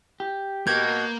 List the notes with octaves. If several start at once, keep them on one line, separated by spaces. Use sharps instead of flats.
G4
B2 A#3 G6 G#6